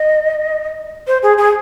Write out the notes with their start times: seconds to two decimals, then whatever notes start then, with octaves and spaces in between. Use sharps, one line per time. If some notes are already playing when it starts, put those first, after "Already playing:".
Already playing: D#5
1.07 C5
1.23 G#4
1.38 G#4